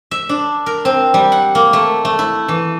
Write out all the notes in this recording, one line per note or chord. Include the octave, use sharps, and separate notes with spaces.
E5
D4
A#4
C4
G3
F#5
A#3
A3
A3
E4
E3